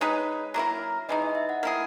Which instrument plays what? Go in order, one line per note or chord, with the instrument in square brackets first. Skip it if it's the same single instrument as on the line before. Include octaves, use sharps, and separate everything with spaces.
[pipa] G#3 D#4 G#4 B4 [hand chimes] C#5
[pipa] F#3 A#3 E4 A#4
[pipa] E3 G#3 D#4 [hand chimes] D#5
[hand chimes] D#5
E5
F#5
[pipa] A#3 E4 G#4